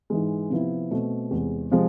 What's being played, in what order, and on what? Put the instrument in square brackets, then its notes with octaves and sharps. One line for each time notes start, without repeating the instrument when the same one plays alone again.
[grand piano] G#2 E3 G#3
C3 F3 B3 E4
B2 A3 C4
E2 C3 G#3
C3 F3 G#3